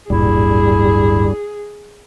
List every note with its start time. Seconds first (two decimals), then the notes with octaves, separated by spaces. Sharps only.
0.10 D1 G1 G2 A#2 G3 E4 G#4